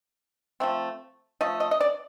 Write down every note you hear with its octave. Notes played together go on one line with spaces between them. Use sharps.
F3 A3 C4
F3 A3 D#5
D#5
D#5
D5